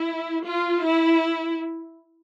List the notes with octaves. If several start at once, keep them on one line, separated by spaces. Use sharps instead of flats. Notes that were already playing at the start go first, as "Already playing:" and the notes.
Already playing: E4
F4
E4